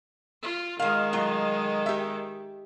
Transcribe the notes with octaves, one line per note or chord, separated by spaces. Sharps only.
F4
D#3 G#3 F4 F5
F#3 A3 F4
G4 E5